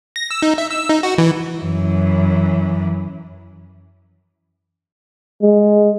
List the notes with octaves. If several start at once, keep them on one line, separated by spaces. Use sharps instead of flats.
A#6
E6
D#4
E5
E6
D#4
F#4
E3
F#2 E3
G#3